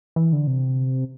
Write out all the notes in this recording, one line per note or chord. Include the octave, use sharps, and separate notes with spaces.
E3
D3
C3